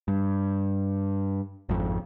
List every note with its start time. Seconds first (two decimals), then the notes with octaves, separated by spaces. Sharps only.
0.08 G2
1.69 G#1 F2